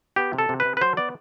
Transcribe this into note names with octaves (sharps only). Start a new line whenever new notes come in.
B3 G4
C3
A4
C3
B4
C3
B4
F#3 C5
B3 D5